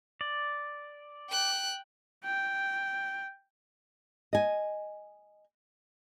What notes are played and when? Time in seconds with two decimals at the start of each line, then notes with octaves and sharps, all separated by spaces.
0.21 D5
1.30 G5 F#6
2.24 G5
4.33 D#5 G#5